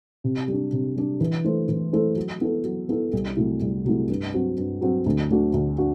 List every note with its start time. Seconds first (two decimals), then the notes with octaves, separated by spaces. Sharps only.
0.24 C3
0.48 G3
0.53 D4
0.73 C3
0.96 G3 D4
1.21 E3
1.45 A3 E4 A4 C5
1.69 E3
1.93 A3 E4 A4 C5
2.16 F#3
2.41 B3 E4 A4
2.64 F#3
2.89 B3 E4 A4
3.13 C2
3.37 C3 F#3 A3 E4
3.61 C2
3.85 C3 F#3 A3 E4
4.10 G2
4.34 F#3 C4 F#4
4.58 G2
4.81 F#3 C4 F#4
5.06 D2
5.30 D3 A3 D4 F#4
5.54 D2
5.78 D4 F#4